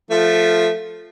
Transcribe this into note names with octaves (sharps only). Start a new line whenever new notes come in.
F3 A3